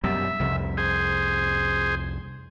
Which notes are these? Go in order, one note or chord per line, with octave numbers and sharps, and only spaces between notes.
F#2 B2 G3 E5
C2 F2
G#4 C5